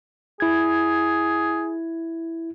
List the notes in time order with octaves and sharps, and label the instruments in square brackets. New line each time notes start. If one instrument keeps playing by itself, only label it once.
[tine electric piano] E4 G#6 [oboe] G#4